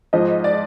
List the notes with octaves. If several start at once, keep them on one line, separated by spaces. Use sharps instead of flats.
G#2 F3 D#5
D5